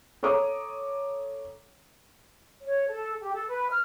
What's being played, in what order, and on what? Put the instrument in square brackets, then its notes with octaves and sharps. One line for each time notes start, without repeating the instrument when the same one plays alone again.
[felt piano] A4 C#5 A#5 D6 D#6
[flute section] C#5
A4
G4
A4
B4
F6